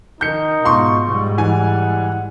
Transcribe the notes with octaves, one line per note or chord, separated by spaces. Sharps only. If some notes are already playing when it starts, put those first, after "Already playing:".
D#3 D#4 G6 C#7
G#2 B2 F4 C6 C#6
G#2 G3
E3 F#5 G#5